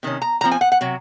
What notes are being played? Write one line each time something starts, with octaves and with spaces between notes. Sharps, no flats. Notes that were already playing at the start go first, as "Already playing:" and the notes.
C3 D#3 C#4
A#5
A#2 F3 C4 A#5
G#5
F#5
F#5
C3 F#3